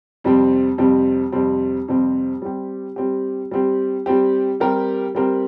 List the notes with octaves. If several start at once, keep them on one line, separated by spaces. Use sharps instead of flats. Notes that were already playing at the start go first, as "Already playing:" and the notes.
F2 C3 G3 C4
F2 C3 G3 C4
F2 C3 G3 C4
F2 C3 G3 C4
G3 C4 G4
G3 C4 G4
G3 C4 G4
G3 C4 G4
G3 C4 G4 A#4
G3 C4 G4 A#4